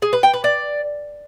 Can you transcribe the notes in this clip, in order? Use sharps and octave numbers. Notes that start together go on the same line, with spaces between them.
G#4
B4
G5
B4
D5